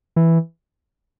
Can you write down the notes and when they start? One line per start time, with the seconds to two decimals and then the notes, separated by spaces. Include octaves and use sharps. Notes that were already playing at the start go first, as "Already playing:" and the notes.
0.16 E3